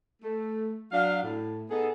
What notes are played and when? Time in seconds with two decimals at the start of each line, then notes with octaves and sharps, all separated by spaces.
0.22 A3
0.92 F#3 D4 F5
1.22 A2
1.70 B3 D#4 G#4 A4